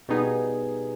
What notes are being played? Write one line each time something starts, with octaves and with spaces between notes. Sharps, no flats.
B2 G3 B3 D#4 G#4